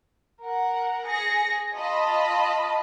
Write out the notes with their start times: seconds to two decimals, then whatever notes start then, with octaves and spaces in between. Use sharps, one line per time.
0.42 A#4 F#5
1.06 G#4 A#6 C#7
1.74 F4 D#5 A5 B5